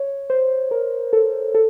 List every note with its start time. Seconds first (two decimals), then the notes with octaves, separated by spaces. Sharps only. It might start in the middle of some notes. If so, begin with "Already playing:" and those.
Already playing: C#5
0.30 C5
0.71 A#4
1.13 A4
1.55 A4